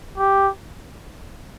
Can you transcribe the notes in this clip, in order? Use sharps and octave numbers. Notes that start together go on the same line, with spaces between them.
G4